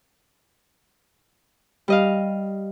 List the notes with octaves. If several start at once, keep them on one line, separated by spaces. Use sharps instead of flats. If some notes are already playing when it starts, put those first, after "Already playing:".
G3 D#5 F5